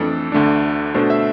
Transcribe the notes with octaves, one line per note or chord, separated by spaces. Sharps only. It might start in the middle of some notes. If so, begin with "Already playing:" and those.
Already playing: F2 E3 A3 D4 A4
D2 D3 A3 D4
B2 A3 D4 C5
E5